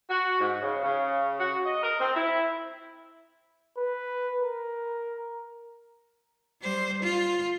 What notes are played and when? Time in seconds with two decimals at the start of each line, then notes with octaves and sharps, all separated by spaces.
0.09 F#4
0.40 G#2
0.62 C#3
0.84 C#3
1.40 F#4
1.66 D#5
1.83 A#4
2.00 C4
2.15 E4
3.77 B4
4.42 A#4
6.62 G3 C5
7.03 F4